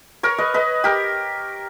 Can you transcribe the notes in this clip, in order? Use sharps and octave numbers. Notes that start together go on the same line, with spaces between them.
A#4 C#5
B4 D#5
B4 D#5
G4 A#4